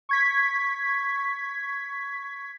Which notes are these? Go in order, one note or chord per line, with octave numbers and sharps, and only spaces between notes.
C#6 G#6 B6